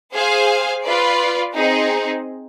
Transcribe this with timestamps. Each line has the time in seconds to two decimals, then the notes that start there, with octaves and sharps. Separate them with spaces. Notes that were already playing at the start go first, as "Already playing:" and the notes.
0.14 G#4 C5 F5 G#5
0.83 F4 B4 D5
1.53 C4 D#4 G#4